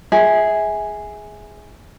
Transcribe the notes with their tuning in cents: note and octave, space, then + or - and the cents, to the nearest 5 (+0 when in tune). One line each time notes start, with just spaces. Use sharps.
G#4 +0 E5 -25